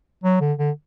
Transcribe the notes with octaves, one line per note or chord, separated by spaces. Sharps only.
F#3
D3
D3